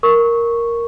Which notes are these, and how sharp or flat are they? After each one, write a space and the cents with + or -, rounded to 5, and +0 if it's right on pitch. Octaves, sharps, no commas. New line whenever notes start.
A#4 +0 C#6 +0